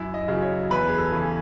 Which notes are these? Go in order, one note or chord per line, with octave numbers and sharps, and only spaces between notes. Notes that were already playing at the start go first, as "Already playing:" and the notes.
Already playing: F#2 E4
D#5
C#3 F#3
C#5
E2 B4
G#4
A4
C#3 E3